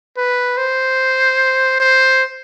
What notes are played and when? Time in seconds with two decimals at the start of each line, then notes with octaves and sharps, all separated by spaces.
0.17 B4
0.57 C5
1.80 C5